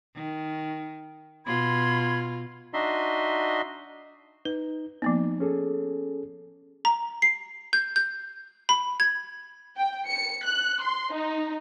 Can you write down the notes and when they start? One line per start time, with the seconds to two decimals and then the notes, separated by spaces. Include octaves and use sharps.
0.15 D#3
1.46 B2 F4 B5 C6 G#6
2.74 D4 D#4 F#4 D#5 E5 C6
4.45 D#4 B4
5.02 F3 A#3 B3 D#4
5.40 C#4 G#4 A4
6.85 A#5
7.22 C7
7.73 G6
7.96 G6
8.69 B5
9.00 G#6
9.76 G5
10.08 C#7
10.44 F#6
10.82 C6
11.13 D#4